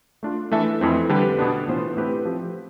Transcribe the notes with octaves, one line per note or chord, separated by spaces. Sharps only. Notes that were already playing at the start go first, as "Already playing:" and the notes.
A3 D4 F4
E3 A3 D4 A4 E5
F2 E3 A3 C4
D3 G3 D4 G4 B4
B2 B3 D4
A2 E3 B3 F4 C5
A3 C4 E4 G4 B4
F3 C4 G4